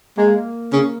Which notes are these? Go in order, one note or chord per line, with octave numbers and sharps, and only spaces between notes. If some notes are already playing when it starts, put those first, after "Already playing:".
G#3 A#3
C#3